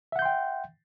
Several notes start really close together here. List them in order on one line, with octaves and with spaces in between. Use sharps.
E5 F#5 G6 C6 G5